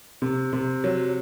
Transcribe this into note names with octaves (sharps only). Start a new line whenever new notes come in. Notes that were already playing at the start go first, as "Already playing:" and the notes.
C3
C3
F#3